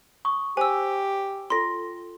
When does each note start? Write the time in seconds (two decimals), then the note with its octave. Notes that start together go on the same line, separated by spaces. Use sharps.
0.25 C#6 D#6
0.57 G4 C5 G#5 E6
1.50 F4 A4 C6 A#6